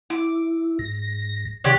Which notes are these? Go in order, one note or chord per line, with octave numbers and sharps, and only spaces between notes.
E4 D6
G#2 A#6
C3 D#3 G4 C#5 D5 F#6